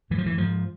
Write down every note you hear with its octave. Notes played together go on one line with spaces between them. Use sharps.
G#2 E3
F3
E3
G#2 F3